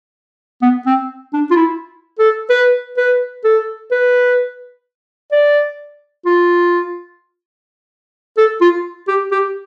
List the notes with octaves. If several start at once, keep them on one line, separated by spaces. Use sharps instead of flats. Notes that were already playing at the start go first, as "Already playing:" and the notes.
B3
C4
D4
F4
E4
A4
B4
B4
A4
B4
D5
F4
A4
F4
G4
G4